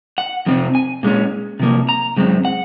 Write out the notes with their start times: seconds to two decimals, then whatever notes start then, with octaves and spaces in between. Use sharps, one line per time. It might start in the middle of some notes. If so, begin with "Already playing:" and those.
0.18 F#5
0.46 F2 C3 F3 C4
0.75 G#5
1.03 A#2 G#3 C#4
1.60 C3 F3 A#3
1.89 A#5
2.16 F#2 C#3 G#3 C4
2.45 F#5